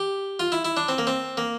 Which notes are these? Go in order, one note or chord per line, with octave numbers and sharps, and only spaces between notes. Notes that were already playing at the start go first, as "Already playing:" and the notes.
Already playing: G4
F4
E4
E4
D4
C4
A#3
C4
A#3